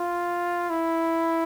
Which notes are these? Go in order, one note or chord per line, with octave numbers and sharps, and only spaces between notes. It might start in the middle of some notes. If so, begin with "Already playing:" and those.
Already playing: F4
E4